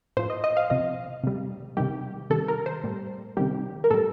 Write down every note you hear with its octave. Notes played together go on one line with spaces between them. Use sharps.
A2 F3 C5
D#5
D#5
F5
C3 F3 D#5
C3 G3
C3 D#3 G3 G4
C3 D#3 G3 A4
A#4
C5
A2 G3
C3 D#3 G3 G4
A#4
A2 G3 A4